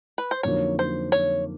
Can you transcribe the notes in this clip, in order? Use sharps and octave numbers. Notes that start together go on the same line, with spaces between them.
B4
C5
F2 D3 F#3 A#3 D#4 C#5
C5
C#5